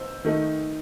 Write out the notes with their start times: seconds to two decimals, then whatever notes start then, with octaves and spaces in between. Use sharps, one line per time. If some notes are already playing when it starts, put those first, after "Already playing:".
Already playing: D#4 C5 E6
0.25 D#3 A3 D#4